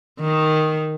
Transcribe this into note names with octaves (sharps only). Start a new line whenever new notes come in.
D#3